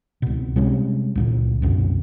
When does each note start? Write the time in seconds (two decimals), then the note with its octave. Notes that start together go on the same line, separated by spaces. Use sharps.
0.22 C#2 B2
0.56 C3 G3 G#3 C#4
1.16 C#2 A#2 D3
1.62 C2 F#2 B2 D3